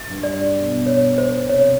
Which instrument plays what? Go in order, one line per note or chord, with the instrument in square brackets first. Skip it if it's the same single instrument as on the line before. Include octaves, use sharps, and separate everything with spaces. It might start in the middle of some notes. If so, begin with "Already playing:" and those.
Already playing: [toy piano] E5
[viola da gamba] G2
[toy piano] D5
[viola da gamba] B2
[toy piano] C#5
C5
[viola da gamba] C3 [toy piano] C#5